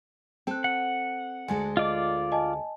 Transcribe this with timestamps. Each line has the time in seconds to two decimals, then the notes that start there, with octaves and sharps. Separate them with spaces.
0.47 C4 A4 G5 F#6
0.64 F#5 F#7
1.48 D2 G#3 A4 G#5
1.77 F4 D5 D#5 D6
2.32 D#5 G#5 A5